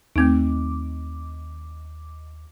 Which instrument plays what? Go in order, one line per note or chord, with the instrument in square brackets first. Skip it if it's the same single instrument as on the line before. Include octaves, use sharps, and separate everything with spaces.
[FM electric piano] D#2 D6 [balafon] A3 C4 D#4